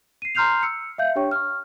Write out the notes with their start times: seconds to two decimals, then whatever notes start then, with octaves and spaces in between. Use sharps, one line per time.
0.22 C7 D#7
0.35 A#5 C6 F6 G6 C7 F7
0.63 E6 C#7
0.98 E5 F5 G6
1.16 D4 G4 C#5 G5 C#6
1.31 C#6 F6